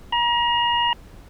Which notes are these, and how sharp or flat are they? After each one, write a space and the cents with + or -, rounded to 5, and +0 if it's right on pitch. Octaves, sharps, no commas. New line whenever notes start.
A#5 +35